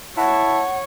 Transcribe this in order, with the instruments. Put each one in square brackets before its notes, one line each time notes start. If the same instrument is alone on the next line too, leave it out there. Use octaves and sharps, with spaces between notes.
[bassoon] E4 [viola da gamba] C#5 [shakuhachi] F#5 [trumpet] A5